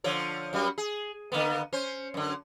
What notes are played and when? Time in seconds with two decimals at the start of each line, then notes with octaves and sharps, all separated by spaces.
0.04 D3 F3 C#5
0.53 F#2 G3 F#4
0.78 G#4
1.32 D3 A#3 B3
1.73 C#4 C5
2.14 F#2 D3